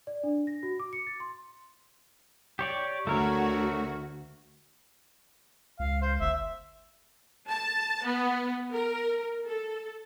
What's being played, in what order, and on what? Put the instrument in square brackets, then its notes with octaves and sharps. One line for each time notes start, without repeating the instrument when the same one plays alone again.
[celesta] D5
D4
A#6
F#4
D6
C#7
A6
C6
[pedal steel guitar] G4 C#5 D5
[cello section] D2 F#4 [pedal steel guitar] A3 A#4 C#5
[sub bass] C#2 [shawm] F5
[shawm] C5
[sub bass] G1 [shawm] E5
[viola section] A5
B3
A#4
A4